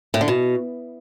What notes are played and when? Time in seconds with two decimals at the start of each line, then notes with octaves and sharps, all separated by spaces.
0.14 A2
0.21 D3
0.28 B2